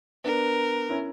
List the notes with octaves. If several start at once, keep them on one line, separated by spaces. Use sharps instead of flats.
B3 D4 A#4
C#4 E4